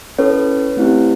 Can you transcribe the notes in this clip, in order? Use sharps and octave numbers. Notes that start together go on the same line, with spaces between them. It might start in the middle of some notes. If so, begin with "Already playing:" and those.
C#4 E4 A4 B4 C#5
A3 C4 E4 G4